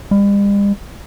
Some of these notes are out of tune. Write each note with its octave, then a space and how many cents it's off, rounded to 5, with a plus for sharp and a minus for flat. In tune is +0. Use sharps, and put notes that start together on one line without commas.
G3 +45